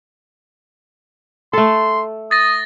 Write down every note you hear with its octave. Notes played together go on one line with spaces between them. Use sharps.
A3 A4 C6
D#6 A6 A#6